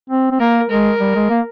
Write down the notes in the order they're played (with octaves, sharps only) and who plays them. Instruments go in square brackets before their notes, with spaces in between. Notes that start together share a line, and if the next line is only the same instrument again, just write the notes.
[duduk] C4
C4
[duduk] A#3 [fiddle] A#4
[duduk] G#3 [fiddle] A#4
[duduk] G3
G#3
A#3